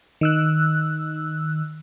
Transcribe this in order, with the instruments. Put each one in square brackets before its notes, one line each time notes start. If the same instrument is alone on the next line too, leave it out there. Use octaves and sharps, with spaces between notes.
[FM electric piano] D#3 E6 F#6